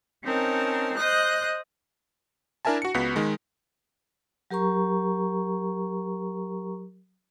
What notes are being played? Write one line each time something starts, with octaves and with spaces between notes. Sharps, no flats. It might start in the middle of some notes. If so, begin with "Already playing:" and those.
C4 C#4 D#4 A#4 A5
C5 D#5 D#6 F#6 G6
D4 E4 A#4 E5 G#5 A5
F#4 C#7
C#2 B3 F#4 B6
D#3 G#3
F#3 G4 A#4 A#5 C#6